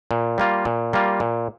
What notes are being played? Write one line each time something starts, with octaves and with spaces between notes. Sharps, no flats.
A#2
G3 A#3 F4
A#2
G3 A#3 F4
A#2